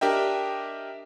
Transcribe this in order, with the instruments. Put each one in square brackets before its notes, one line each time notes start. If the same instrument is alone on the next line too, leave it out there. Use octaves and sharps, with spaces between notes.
[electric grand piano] D4 G4 A#4 D#5 E5 G5